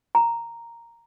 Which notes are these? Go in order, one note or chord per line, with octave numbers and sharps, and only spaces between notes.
A#5